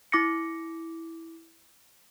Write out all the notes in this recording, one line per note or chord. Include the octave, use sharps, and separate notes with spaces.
E4 D6 A#6 C#7